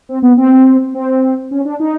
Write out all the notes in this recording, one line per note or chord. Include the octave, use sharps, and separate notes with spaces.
C4
B3
C4
C4
C#4
D4
D#4